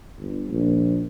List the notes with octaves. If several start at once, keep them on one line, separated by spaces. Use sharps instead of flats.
G1
A#1